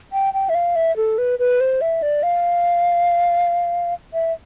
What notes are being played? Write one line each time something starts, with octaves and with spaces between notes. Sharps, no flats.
G5
G5
E5
F5
E5
A4
B4
B4
C5
E5
D5
F5
E5